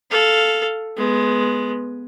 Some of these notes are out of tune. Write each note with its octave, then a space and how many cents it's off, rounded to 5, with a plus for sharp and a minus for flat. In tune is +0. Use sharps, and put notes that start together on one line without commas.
A4 +0 F5 +0
G#3 +15 B3 +0